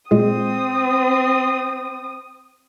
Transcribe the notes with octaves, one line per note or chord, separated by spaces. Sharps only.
A#2 G#3 C4 G#4 D#6